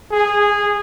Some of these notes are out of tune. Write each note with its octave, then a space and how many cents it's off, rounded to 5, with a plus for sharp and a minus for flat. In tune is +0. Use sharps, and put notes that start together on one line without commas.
G#4 -15